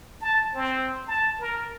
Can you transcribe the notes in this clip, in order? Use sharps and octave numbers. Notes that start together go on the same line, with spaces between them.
A5
C4
A5
A#4